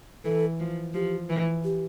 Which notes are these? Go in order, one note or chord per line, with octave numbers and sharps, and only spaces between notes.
E3 A4
F3
F3 G4
E3
G4